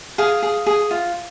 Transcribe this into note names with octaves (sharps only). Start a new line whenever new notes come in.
G#4 F5
G#4
G#4
F4